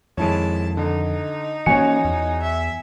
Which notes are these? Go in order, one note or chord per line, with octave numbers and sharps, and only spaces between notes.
F2 D#3 G#3 E4 C#5 A5
D3 D#4
E3 A#3 C#4 F#4 C#5 G#5 C#7
E2
E5